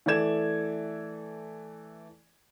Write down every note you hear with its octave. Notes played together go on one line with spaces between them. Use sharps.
E3 A3 A4 D5 G#6 E7